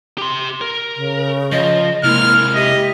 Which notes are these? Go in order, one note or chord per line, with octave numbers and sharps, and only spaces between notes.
G4 C6
A#4
C#3
F3 D#5
C3 G#3 A#3 E4 F6
G4 D#5 E5